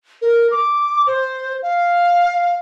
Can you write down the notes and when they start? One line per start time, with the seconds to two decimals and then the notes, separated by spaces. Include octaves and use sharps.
0.22 A#4
0.51 D6
1.07 C5
1.62 F5